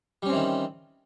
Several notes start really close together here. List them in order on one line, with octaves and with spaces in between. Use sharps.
G3 C#4 C4 E3 D#3